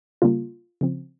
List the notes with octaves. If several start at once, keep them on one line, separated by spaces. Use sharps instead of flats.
C#3 G3 A#3 F4
C#3 F3 C4